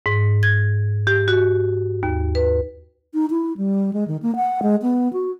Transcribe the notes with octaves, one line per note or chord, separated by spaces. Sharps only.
G#2
G#6
G4
F#4
D#2
B4
D#4
E4
G3
G#3
D#3
A#3
F#5
G#3
B3
F#4